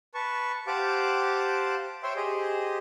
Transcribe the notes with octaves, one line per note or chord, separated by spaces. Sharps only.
B4 A5 C#6
G4 C5 F5 F#5 A5 D6
C5 C#5 E5 G5 C6
G4 G#4 C5 D#5